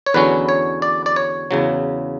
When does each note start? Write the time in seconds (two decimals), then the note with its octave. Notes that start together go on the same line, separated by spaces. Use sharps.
0.06 C#5
0.14 E2 D3 F#3 C#4 B4
0.49 C#5
0.82 D5
1.06 D5
1.16 C#5
1.51 E2 C#3 F#3